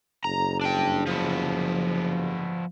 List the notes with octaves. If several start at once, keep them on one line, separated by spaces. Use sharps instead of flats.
F#1 A#5
D4 G5
F3 B3